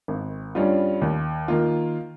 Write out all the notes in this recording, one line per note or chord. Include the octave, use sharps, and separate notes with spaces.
G#1
G2 G3 C#4 F4
D#2
D#3 A#3 F4